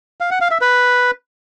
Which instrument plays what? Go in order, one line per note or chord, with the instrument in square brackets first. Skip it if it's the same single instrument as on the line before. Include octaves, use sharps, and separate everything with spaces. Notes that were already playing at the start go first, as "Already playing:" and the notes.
[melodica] F5
F#5
F5
E5
B4